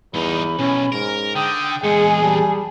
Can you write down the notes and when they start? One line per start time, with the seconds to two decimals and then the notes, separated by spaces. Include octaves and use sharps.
0.14 E2 G2 D#4 B5
0.59 B1 C#4
0.92 G#2 A#4
1.36 D3 G5 D#6
1.84 E2 A#2 G#3 G#4 C#7
2.23 G3 A5